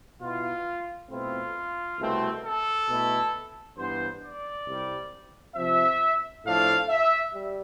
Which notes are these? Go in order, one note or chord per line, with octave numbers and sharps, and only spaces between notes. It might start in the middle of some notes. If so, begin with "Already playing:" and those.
B2 B3 E4 F4
B2 A3 C4 E4 F4
C2 B2 A3 C4
A4
B2 A3 E4
G2 E3 B3 C5
D5
C2 C3 G3
C3 F3 C4 E5
A2 F3 A3 D4 F5
E5
G3